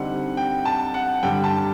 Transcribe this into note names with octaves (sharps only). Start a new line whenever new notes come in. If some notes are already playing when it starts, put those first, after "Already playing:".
Already playing: D3 G3 C4 D#4 F#5
G5
A5
F#5
G2 D3 G3 G5
A5